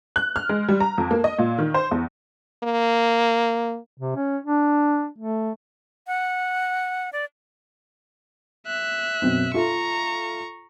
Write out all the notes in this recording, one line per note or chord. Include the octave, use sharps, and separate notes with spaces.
F#6
F6
G#3
G3
A#5
F2
A#3
D#5
A#2
D#3
C5
E2
A#3
C3
C#4
D4
A3
F#5
D5
E5 F#6
F#2 B2 C4
F4 A4 E5 A#5 C#6